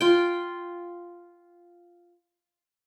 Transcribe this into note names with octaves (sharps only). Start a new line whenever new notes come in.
F4 G5